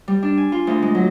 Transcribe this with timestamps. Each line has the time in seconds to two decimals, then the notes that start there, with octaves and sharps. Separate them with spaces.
0.08 G3
0.22 D4
0.37 G#5
0.52 F4
0.67 D2
0.82 G#3
0.95 F#3